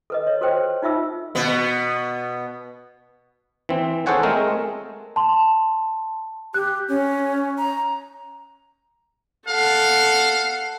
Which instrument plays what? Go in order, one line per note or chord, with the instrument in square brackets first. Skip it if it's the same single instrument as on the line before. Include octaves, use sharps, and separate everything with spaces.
[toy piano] A4 B4 D#5
C#5
F#4 A4 B4 C5 G5
D#4 F4 E5 E6
[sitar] B2 B3
[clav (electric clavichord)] E3 C4
G#4 A4 C5 C#5 F#5 G#5
G#3 A3 C4 A#4
[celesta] A5 C6
[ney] G4 [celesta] F#6
[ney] C#4
A#5
[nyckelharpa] A4 F#5 [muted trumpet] F5